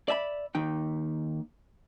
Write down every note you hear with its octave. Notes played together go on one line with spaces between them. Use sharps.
D5 E5 G#5 B5
D#2 D#4 G5